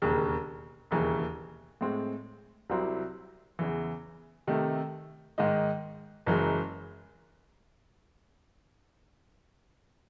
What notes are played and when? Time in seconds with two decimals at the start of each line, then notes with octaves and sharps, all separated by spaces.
0.02 E1 D#2 C#3
0.91 E1 D#2 C#3 E3
1.81 A2 G#3 C4
2.69 C2 C3 F#3 C4 E4
3.59 E2 C#3 E3
4.47 C3 D#3 A3
5.38 G#2 D#3 G#3 D#4
6.26 F#1 F#2 E3 G#3